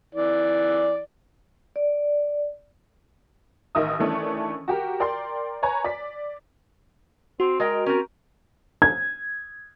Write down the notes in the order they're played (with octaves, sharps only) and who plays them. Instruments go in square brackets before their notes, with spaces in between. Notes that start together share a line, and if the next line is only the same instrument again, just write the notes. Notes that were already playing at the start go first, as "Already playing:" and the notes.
[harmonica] E3 D5
[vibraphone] D5
[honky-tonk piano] A1 D#3 D#4 E5 D#6
D#3 E3 A3 C#4 D4
F#4 G4 A#4
A#4 D5 G5 C6
B4 C#5 G#5 A#5
D5 B6
[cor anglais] C4 [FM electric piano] F#4
[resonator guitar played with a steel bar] G#3 D#5 G5 [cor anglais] A#4
[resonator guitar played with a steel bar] C4 C#4 [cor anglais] A#4
[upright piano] G#6